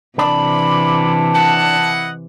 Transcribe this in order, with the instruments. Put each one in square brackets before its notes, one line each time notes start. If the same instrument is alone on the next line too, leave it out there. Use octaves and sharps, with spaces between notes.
[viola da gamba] C3 E3 [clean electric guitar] D4 [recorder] B5
[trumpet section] E4 D#5 F#5 [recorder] A5